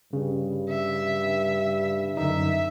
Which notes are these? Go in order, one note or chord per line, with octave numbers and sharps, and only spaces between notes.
G2 C#3
E5
F#2 D3 D#4 E5